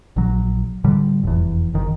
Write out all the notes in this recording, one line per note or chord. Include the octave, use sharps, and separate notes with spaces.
A#1 F#3
A2 D3 G3
F1 E2
F#1 D#3